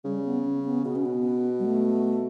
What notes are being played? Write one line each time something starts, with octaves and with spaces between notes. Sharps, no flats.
C#3 G3
B3
C#4
B3
B2 B3
C#4
B3
G3
A3